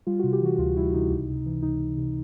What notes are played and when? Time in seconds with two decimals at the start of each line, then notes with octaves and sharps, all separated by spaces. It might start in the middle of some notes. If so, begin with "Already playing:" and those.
0.07 G3 F4
0.19 C3 F#4
0.33 G4
0.41 E3 F#4
0.58 D2 F4
0.77 G3 E4
0.94 C3 D#4
1.10 C#2
1.29 C3
1.46 E3
1.63 C#2 D#4
1.80 C#2
1.97 C3